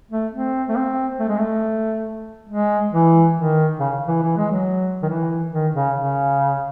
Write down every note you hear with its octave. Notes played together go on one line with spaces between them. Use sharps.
A3
C4
A3
C4
A3
G#3
A3
G#3
E3
D#3
C#3
E3
E3
G#3
F#3
D#3
E3
D#3
C#3
C#3